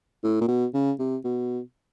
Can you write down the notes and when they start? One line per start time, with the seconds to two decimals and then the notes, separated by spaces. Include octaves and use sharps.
0.24 A2
0.41 A#2
0.48 B2
0.74 C#3
0.99 C3
1.24 B2